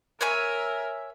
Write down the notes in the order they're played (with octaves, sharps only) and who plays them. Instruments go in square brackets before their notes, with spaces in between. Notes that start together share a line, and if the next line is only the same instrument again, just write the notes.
[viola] A#4 [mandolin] C#5 E5 G#5